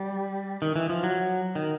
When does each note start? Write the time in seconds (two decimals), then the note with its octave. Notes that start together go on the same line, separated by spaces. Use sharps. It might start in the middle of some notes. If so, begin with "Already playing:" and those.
Already playing: G3
0.62 D#3
0.76 E3
0.90 F3
1.03 F#3
1.55 D#3